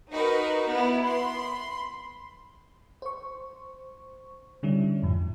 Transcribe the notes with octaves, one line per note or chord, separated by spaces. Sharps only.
D#4 F#4 A#4 B4
B3 E4
B5 C6
C5 C#6
D3 G3 C#4 D4 E4
F2 G#2 F3